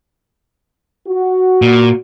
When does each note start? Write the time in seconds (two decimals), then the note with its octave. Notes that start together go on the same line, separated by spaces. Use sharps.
1.07 F#4
1.62 A#2